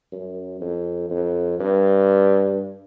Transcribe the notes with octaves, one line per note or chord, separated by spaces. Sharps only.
F#2
F2
F2
G2